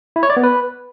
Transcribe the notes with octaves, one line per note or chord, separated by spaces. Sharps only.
E4
C#5
D5
B3
B4